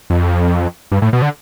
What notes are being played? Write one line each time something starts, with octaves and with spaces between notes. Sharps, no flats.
F2
G2
A2
B2
D3